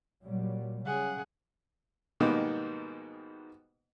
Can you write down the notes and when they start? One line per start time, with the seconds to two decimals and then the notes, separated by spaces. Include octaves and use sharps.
0.24 A#2 F#3 G3
0.86 C#3 G#4 F#5
2.20 G#2 B2 D#3 G3 A#3 B3